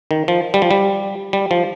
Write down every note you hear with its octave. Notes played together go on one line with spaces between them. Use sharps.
D#3
F3
G3
F3
G3
G3
F3